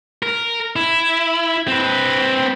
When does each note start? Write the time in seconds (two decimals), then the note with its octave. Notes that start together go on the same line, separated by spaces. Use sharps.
0.23 A#4
0.76 E4
1.68 C4 B4